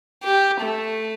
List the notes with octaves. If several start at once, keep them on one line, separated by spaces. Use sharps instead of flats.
G4
A3